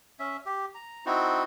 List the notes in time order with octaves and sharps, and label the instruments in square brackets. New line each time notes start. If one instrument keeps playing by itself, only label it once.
[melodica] C#4 E5
G4
A#5
C4 D#4 E4 F#4